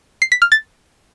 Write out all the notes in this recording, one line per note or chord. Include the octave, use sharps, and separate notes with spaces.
C7
B6
F6
A6